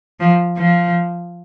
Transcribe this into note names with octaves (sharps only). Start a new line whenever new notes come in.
F3
F3